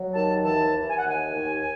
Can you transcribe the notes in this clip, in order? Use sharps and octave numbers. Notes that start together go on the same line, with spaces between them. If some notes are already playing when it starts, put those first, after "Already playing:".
Already playing: F#3
D#2 A5
E3 A5
E3
G#5
F#5
D#2 G#5
D#2